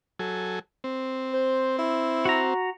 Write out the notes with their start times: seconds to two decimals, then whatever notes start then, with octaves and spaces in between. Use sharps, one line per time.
0.19 F#3 A4 G#5
0.84 C4
1.33 C5
1.79 E4
2.25 F#4 A#5